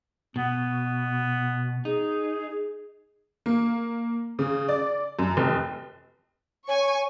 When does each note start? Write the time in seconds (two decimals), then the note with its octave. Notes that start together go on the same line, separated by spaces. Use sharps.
0.36 B2 B3
1.85 D#4 G#4
3.46 A#3
4.39 C#3
4.69 D5
5.19 F#2
5.37 F1
6.68 C#5 G#5 C#6